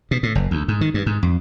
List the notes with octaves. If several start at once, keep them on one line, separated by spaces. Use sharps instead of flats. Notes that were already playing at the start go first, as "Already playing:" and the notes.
B2
A2
F#1
D2
G#2
D#3
G2
G#2
F2